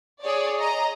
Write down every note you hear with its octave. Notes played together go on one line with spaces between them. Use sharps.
G#4 C#5 D5
D#5 A#5